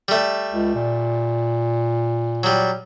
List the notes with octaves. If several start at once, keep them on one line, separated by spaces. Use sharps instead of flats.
G3 A3
C#2
A#2
F#3 G3